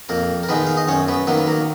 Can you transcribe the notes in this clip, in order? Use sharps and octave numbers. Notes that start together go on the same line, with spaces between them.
F2 A#3 A#4
A#4
D#3 G#3 B3 D#4 B4
F5
D#5
F#2 C#4 C#5
B3 B4
D#3 F#3 A#3 B3 B4
B4
A#3 A#4